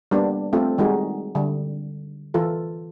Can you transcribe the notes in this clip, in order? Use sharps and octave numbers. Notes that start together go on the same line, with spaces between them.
G3 A#3 B3 D4
A3 C4 F4 A4
D#3 G3 G#3 D#4 F#4 G#4
D3 G3
E3 F4 A4